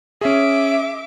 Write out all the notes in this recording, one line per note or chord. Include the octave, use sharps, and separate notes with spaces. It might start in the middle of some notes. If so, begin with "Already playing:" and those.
C#4 G#4 E5 D6